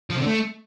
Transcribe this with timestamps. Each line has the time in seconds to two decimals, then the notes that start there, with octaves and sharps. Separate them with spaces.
0.10 F3
0.15 C3
0.20 D3
0.25 A3